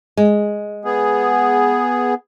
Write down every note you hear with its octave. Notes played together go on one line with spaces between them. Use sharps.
G#3
B3 G#4